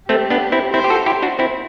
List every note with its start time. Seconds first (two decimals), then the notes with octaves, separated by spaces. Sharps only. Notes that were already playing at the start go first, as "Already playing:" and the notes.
0.09 A3 C4 G4
0.30 B3 D4
0.52 C4 E4
0.74 C4 E4 C5
0.84 G4
0.90 F#4 A4
1.06 E4 G4 C5
1.22 D4 F#4
1.39 C4 E4